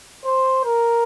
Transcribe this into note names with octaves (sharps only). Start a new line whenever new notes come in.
C5
A#4